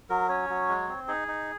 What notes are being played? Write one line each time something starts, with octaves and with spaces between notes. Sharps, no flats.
F#3 A#4
C#4 C#5
F#3
G#3
C4
D#4 G#4
D#4